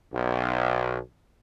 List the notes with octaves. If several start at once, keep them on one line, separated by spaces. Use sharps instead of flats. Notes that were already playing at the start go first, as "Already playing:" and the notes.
B1